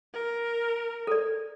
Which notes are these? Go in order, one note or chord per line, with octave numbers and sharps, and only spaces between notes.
A#4
A4 D5